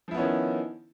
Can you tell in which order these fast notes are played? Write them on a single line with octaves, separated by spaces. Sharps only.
F3 E4 B3 C#4 D#3